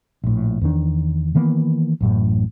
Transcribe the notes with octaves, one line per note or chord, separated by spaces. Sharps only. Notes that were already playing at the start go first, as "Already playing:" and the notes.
A#1 A2
E2 D#3 D4
D#3 E3 A#3 B3
A1 F#2 A2